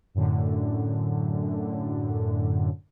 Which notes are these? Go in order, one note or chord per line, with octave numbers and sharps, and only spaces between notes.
F#2 A2 D3